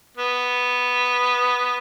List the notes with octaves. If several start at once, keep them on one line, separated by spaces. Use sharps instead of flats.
B3